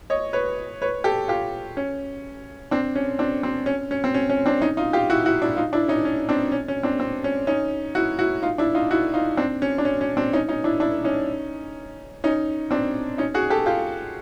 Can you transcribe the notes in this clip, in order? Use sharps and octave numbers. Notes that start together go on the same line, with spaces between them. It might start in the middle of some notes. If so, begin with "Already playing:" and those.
C#5 D#5
B4 C#5
B4 C#5
G4 A4
F4 G4
C#4
C4 D4
C#4
C4 D4
C4
C#4
C#4
C4
C#4
C#4
C4 D4
C#4 D#4
D#4 F4
F4 G4
E4 F#4
E4 F#4
D4 E4
D#4 F4
D4 E4
C#4 D#4
C#4
C4 D4
C#4
C#4
C4 D4
C4
C#4
C#4 D#4
E4 F#4
E4 F#4
D#4 F4
D4 E4
D#4 F4
E4 F#4
D#4 F4
C4 D4
C#4
D4
C#4
C#4
C4 D4
C#4 D#4
C#4 D#4
D4 E4
D4 E4
C#4 D#4
C#4 D#4
C4 D4
C#4 D#4
F#4 G#4
G4 A4
F4 G4